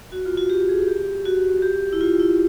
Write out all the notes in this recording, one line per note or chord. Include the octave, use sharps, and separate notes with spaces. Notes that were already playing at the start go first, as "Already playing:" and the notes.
F#4
F4
F#4
G4
G#4
G4
F#4
G4
E4
F4
E4